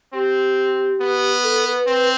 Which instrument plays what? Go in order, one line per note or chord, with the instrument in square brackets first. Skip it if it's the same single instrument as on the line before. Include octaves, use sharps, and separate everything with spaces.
[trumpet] C4 [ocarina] G4
[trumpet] B3
[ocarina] A4
B4
[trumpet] C4 [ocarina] B4